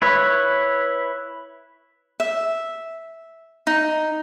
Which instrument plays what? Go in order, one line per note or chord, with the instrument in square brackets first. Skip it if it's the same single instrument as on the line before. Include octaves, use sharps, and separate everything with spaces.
[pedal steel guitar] E4 B4 C#5
[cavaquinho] E5
D#4